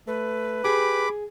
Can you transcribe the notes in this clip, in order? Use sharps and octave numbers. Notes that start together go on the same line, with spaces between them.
A3 B4
G4 G#4 B5 D6